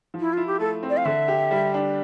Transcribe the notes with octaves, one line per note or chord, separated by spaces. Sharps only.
F3
E4
E4 F4
G4
A3 A4
C4
D5
F5
D3 E5
G4
G3
D4